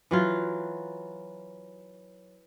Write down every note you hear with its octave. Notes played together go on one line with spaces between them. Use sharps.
E3 F#3 F4